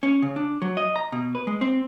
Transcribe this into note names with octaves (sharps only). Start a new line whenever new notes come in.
C#4
C#3
D4
F#3
D#5
A#5
B2
B4
G#3
C4